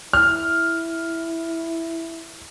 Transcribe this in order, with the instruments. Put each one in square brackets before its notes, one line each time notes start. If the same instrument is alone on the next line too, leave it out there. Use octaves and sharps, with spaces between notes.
[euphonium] E4 [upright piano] F6